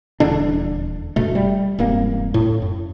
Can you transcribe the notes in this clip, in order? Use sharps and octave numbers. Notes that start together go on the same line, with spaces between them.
D#1 E2 D3 D4
F#1 B2 A3
G3
E1 G2 A#3 C4
A2
F#2